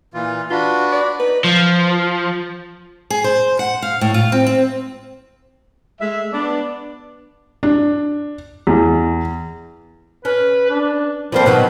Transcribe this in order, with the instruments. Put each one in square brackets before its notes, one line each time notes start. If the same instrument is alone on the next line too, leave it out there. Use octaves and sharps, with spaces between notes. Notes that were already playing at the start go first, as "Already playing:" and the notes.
[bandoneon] A#2 E3 F4
[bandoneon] D4 F#4 B4 [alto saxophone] F4
[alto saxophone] D5
[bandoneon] D#4 [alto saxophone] B4
[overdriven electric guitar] F3
[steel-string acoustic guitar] G#4
C5
F#5
F5
A2
F4
C4
C4
[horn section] G#3 A3 E5
B3 D4
[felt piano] D4
E2
[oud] C#4 [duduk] B4
[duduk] D4
[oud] F3 A#3 C4 [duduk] G3
[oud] B2 D#3 F#3 [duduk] B4